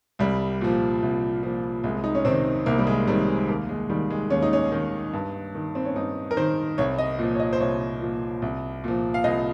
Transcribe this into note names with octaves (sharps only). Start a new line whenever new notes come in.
C2 G3
A#2 F3
C2
A#2 F3
C2 G#3
D#4
C#4
C3 D#3 C4
C2 A#3
G3
G#3
C3 D#3 G3
G#3
D#2 A#3
G#3
D#3 G3
G#3
D#2 C#4
D#4
C#4
D#3
G2
D#3
C4
C#4
G2 D#4
A#4
D#3 C5
C2 C#5
D#5
A#2 F3
C#5
D#5
C5
C2 C#5
A#2 F3
C2
A#2 F3
F5
C2 D#5